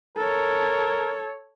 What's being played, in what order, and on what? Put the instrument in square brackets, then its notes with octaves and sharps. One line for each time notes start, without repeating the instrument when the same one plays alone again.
[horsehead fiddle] A4 C#5 [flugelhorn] A#4